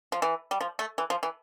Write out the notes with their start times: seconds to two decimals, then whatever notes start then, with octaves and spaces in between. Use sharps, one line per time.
0.12 F3
0.22 E3
0.51 G3
0.61 F3
0.79 A3
0.98 E3
1.10 F3
1.23 E3